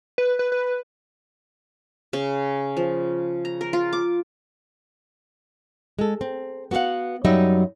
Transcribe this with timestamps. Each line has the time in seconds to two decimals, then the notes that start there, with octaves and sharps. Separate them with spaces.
0.18 B4
0.39 B4
0.52 B4
2.13 C#3
2.77 F3
3.45 A#5
3.61 A#4
3.73 F4
3.93 D6
5.99 G#3 A4
6.21 C4
6.71 B3 F#4 G#4 F5 F#5
7.25 F#2 F#3 G3 D#4 D#5 E5